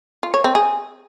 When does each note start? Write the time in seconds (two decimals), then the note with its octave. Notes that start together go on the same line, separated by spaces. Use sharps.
0.23 F4
0.34 C#5
0.44 C4
0.55 G#4